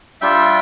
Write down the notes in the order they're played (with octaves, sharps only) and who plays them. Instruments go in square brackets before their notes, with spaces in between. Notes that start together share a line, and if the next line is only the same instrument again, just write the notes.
[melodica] G3 D4 F4 E5 G5